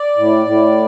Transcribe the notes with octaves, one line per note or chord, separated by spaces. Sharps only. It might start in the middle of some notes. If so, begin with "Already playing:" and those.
Already playing: D5
A2
A2